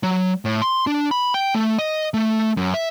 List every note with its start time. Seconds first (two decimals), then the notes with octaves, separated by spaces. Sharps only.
0.03 F#3
0.45 A2
0.62 C6
0.87 D4
1.11 B5
1.34 G5
1.55 A3
1.79 D#5
2.14 A3
2.57 F#2
2.74 E5